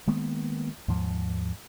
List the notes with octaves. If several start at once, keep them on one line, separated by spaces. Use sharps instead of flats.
D#3 G#3 A#3 B3
D#2 G#2 F3